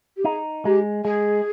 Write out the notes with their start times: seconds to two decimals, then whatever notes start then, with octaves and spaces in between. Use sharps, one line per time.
0.16 G4
0.24 D#4 G#4
0.65 G#3 G4
1.04 G#3 G#4